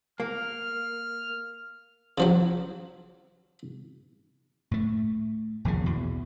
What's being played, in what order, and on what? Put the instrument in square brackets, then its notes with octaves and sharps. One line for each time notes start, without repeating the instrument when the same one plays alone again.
[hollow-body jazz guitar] A#3 [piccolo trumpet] F6
[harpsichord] C#3 F3 F#3
[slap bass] A2 A3
A#1 D#2 A#2 C#3
E2 B2